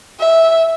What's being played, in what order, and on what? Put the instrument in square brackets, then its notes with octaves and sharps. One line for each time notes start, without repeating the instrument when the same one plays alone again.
[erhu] E5